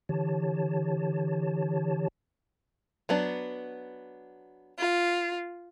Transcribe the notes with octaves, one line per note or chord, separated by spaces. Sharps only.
D3 E3 G4 C#5 A5
F#3 B3 D4
F4